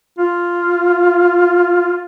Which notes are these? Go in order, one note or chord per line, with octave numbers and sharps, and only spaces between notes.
F4